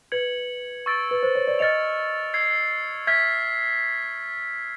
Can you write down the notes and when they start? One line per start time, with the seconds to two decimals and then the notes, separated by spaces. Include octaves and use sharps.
0.12 B4 G#6 C#7 F#7
0.86 C#6 E6 A6 D7
1.11 B4
1.23 C5
1.35 C#5
1.47 D5
1.59 D#5 F6 A6 C#7 F7
2.34 E6 G#6 C7
3.07 E5 F6 G#6 B6